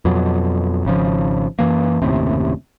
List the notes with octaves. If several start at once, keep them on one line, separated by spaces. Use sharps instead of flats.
F2 B2 F#3
G#1 C#3 F3
F#2 E3 A#3
F#1 D#2 A2 C3